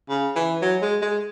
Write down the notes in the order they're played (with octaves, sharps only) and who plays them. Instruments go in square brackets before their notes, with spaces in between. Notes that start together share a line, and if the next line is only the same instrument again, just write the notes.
[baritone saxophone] C#3
E3
F#3
G#3
G#3